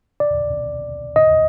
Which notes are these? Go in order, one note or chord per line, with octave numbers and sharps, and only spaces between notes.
D5
D#5